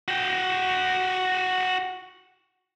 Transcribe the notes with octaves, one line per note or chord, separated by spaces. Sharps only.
F#4 G5